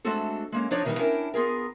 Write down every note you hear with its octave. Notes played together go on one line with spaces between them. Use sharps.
G#3 A3 C4 D4 F#4 A4
G#3 A#3 C#4
F3 D4 D#4 C#5 D5
B2 D#3 E3 G3 B3 D#4
C#4 D4 E4 A#4 G5
B3 F4 G#4 A#4